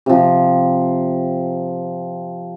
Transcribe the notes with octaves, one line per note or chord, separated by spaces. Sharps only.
C3 F3